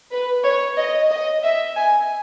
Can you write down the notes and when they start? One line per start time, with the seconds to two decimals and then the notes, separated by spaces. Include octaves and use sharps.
0.13 B4
0.45 C#5
0.78 D#5
1.11 D#5
1.43 E5
1.77 G#5